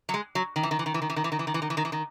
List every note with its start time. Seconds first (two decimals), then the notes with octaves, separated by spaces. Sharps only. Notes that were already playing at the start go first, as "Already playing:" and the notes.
0.09 F#3
0.14 G#3
0.35 F#3
0.56 D#3
0.63 E3
0.71 D#3
0.79 E3
0.86 D#3
0.94 E3
1.02 D#3
1.10 E3
1.16 D#3
1.24 E3
1.32 D#3
1.39 E3
1.47 D#3
1.54 E3
1.62 D#3
1.70 E3
1.77 D#3
1.85 E3
1.92 D#3